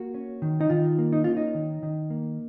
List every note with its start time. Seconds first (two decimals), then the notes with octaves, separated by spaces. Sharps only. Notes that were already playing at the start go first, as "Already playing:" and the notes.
Already playing: A#3 F#4
0.14 C#4
0.42 D#3
0.61 D#4
0.70 D#3 F4
0.99 A#3
1.13 D#4
1.24 C#4 F4
1.37 D#4
1.55 D#3
1.83 D#3
2.10 A#3